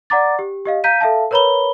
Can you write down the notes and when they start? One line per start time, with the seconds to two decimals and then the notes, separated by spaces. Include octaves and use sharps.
0.10 D5 F#5 A#5 D6 A6
0.39 G4
0.65 G4 D#5 F5
0.84 F5 A#5 G6 B6 D#7
1.01 A4 E5 F5 A5
1.31 A#4 B4 C#5 A#5 B5 G7